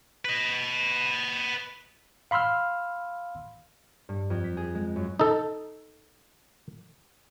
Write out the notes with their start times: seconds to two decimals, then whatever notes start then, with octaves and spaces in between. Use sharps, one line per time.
0.25 B4 D#5
2.31 F5 B5 C6 E6 F6
4.09 G2
4.30 F2
4.44 B6
4.57 G#4
4.75 G#3
4.96 F#2
5.19 D#4 A4